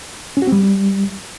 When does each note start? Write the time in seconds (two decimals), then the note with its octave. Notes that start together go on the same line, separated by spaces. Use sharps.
0.37 C#4
0.42 F#4
0.47 C4
0.52 G3